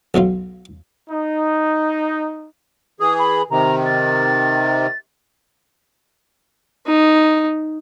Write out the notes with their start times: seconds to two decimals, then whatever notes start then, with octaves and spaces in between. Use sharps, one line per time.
0.14 B1 B2 F#3 F4
1.10 D#4
3.00 E3 G#4 D#6
3.19 B5
3.50 C3 D#3 A#5
3.85 A6
6.87 D#4